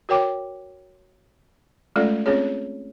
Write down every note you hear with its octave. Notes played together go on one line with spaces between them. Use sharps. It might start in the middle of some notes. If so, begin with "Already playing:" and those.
F#4 A#4 C#5 G5 D6
G#3 A3 C#4 F4 A4 D5
C4 C#4 F4 G#4 C#5